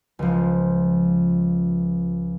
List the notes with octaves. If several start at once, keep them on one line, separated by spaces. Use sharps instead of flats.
C#2 F3